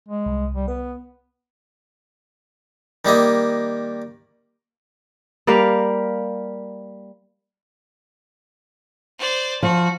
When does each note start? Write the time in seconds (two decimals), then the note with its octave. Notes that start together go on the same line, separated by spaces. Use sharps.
0.08 G#3
0.26 C2
0.55 G3
0.68 B3 B4
3.05 D#3 G3 A#3 D#5
5.47 G3 A#3 A#4 F5
9.19 C5 D5
9.63 F3 F#4